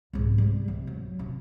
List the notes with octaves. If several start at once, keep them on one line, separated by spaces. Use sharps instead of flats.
C2 G#2
C3 G3
C3
F#3
C3 C#4